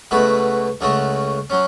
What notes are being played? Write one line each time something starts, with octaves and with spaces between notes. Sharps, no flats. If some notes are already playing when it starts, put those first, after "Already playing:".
C#2 B2 A3 F#4 B4
C#2 C#3 A3 F#4
F#3 C#4